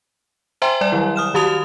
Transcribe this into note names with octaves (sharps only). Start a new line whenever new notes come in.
C5 E5 G5 G#5 A#5 C6
G3 D5 G#5
D#3 F#3 E4
D#6 F6 E7
D#3 F#4 G4 A5 D#6 F7